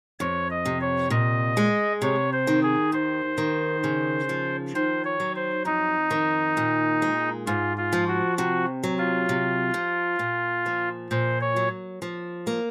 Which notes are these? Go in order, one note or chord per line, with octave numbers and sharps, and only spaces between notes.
F2 C#5
D#5
C3
C#5
A#2 D#5
G#3
C3 C#5
C5
D#3
G#4
D#2 C5
D#3
C#3
F3
D#3 C5
C#5
F#3
C5
F2 D#4
D#3
A#2
G#3
G#2 F4
F4
F3
F#4
C3 F#4
F#3
F4
C3
F3
A#2
F3
A#2 C5
C#5
F#3
F3
A#3